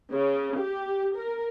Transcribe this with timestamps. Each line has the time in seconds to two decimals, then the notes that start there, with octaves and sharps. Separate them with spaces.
0.13 C#3
0.60 G4
1.18 A#4